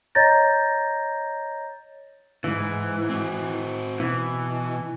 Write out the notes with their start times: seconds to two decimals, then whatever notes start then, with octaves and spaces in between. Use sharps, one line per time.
0.15 C#5 D#5 A#5 G6 A6 A#6
2.44 D2 G#2 E3
3.09 C4 F#4
4.00 B2 E3